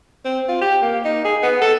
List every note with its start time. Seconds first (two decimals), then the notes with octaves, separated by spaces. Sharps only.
0.25 C4
0.48 F4
0.61 G4
0.82 A#3
1.05 D#4
1.25 G#4
1.43 B3
1.61 A4